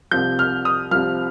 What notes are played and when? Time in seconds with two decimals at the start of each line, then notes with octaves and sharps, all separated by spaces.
0.11 C2 C3 F3 G6
0.39 F6
0.65 D#6
0.91 C2 C3 F3 F6